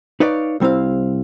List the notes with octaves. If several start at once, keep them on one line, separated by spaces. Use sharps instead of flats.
D#4 B4 C#5 D5 F5
C2 G3 C4 E4 F5